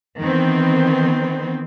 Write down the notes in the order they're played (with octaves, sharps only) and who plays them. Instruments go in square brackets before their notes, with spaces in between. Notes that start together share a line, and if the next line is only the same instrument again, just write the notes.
[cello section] D#3 E3 B3 C4